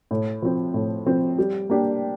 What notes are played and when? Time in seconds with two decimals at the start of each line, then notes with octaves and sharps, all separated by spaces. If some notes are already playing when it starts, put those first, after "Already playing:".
0.11 A2
0.42 F3 C4
0.74 A2
1.06 F3 C4
1.38 G3
1.70 A#3 D4 G4